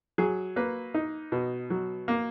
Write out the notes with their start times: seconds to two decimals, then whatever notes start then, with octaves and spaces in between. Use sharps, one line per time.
0.18 F#3 G#4
0.56 A#3 B4
0.94 D#4
1.32 B2
1.70 F#3
2.08 A#3